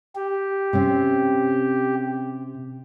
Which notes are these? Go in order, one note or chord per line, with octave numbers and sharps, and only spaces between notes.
G4
C3 C4 C#4